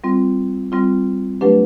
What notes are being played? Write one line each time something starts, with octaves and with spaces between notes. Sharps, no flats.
G3 C4 F4
G3 C4 F4
F#3 A3 D4 G4 B4